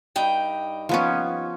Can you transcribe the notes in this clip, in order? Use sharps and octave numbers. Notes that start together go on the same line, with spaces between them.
G2 D#4 G5
F3 B3 C#4